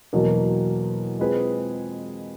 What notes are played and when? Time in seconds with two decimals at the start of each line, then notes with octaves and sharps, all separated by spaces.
0.13 E2 B2 F#3 A#3
1.19 G#3 C4 F4 G#4 B4